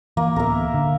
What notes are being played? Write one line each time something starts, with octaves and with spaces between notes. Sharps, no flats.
E3 A#3
D1 B3 A#4 E5
D3